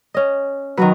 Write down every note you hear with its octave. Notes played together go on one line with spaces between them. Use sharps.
C#4 D#5
D#3 F#3 F#4 B4